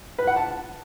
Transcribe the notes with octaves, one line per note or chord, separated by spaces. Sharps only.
B4
F#5
A5